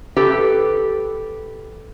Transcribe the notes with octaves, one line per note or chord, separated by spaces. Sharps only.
G4 A4 B4